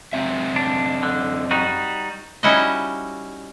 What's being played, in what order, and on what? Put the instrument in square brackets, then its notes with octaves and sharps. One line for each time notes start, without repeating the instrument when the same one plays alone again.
[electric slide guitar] F#2 C4 E5
[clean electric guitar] D4
D3
G3 D#4 F#4
[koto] G3 C#4 D#4 E4 F#4 D#5